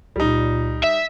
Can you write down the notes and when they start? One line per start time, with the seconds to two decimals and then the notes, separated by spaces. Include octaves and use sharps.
0.16 C#2 A#2 G3 D#4
0.83 E5